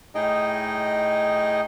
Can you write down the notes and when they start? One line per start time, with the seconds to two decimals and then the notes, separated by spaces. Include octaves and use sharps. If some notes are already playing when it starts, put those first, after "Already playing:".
0.15 A2 D#4 G#4 D#5 G5